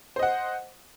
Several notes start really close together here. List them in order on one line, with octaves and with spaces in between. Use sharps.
C5 D#5 F#5